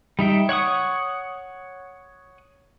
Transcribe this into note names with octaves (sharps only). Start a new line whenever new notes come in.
G3 D#4 E5 G5
C#5 F#5 C#6 D#6